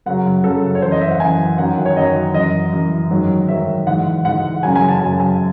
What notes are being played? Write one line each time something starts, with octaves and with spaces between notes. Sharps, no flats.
F#2 C#3 F#3 F#5
F#2 C#3 F#3 A4
C#5
F#2 E3 C5
D#5
E5
F#5
F#2 E3 G#5
F#2 D#3 F#3 F#5
C#5
F#2 D#3 F#3 D#5
F#2 E3 D#5
F#2 E3
G#2 D#3 F#3
G#2 D#3 F#3 E5
G#2 E3 F#5
G#2 E3 F#5
F#2 C#3 F#3 G#5
G#5
A5
F#2 C#3 F#3 G#5
G#5